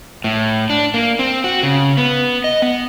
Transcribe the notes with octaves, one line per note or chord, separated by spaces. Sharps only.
A2
D4
A#3
C4
F#4
C#3
B3
D#5
B3